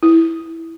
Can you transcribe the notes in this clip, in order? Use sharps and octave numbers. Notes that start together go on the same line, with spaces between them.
E4